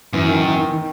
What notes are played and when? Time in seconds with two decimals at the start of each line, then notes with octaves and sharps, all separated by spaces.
0.13 F#2 E3
0.28 D#3
0.42 D#3
0.57 D#3
0.71 D#3